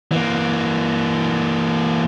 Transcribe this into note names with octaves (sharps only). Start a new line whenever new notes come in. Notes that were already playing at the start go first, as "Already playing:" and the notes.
E3 A#3